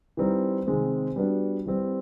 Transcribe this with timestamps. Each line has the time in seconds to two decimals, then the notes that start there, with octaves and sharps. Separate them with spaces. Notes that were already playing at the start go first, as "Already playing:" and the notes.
0.17 E3 G3 C4 D#4
0.67 C3 D#3 G#3 C4
1.16 G3 B3 D4 F#4
1.66 E3 G3 C4